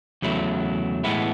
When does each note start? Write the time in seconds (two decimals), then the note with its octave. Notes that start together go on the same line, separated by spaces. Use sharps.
0.22 E2 C#3 F#3 A3 E4
1.04 A2 E3 G#3 B3 E4